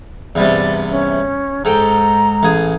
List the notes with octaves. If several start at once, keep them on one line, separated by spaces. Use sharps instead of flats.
E2 G2 C3 D5
C#4
G#2 A4 G5 A#5
A1 G#4